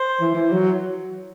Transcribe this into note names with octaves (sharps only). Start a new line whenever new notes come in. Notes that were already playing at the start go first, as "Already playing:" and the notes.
Already playing: C5
E3
E3
F#3